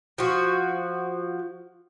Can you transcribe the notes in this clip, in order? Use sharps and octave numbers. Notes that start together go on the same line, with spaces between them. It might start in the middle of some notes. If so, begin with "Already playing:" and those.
F3 F#4